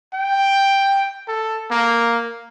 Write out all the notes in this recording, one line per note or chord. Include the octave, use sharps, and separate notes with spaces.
G5
A4
A#3